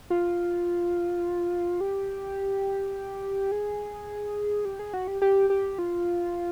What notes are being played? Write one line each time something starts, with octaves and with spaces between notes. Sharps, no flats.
F4
G4
G#4
G4
G#4
F#4
G4
G4
G4
F4